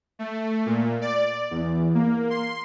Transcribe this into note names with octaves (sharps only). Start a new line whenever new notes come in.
A3
A#2
D5
E2
A#3
C6